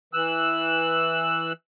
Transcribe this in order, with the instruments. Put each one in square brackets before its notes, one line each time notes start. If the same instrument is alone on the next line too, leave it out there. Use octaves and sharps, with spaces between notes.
[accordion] E3 E6 F#6